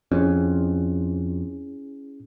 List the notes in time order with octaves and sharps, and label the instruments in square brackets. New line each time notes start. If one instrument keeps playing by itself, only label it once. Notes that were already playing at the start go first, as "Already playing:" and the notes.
[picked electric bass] F2 [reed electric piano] C#4 E4 G#4